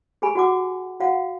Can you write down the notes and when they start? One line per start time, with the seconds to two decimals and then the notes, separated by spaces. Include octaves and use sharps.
0.22 G4 G#4 G#5 B5
0.35 F#4 F#5 D6
1.00 F#4 F5 F#5